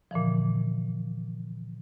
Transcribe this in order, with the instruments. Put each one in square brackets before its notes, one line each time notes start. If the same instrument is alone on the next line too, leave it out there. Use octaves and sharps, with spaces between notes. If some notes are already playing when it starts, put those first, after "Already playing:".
[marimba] A#2 D3 E3 F3